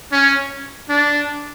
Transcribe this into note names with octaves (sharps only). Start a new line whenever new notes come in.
C#4
D4